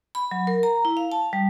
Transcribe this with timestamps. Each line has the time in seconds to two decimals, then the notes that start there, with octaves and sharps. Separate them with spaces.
0.15 B5
0.31 F#3
0.47 A#4
0.63 A#5
0.85 E4
0.97 F5
1.12 A5
1.33 G3